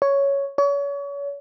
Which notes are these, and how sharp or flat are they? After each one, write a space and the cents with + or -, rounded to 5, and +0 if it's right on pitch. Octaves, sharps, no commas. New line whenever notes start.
C#5 +5
C#5 +35